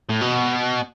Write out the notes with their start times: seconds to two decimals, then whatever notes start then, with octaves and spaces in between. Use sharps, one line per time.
0.10 A2
0.21 B2